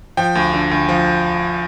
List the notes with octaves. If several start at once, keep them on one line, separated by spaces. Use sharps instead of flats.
F3 G5
D2
D3
D2
F3